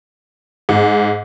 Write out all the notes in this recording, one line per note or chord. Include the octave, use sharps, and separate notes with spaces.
G#2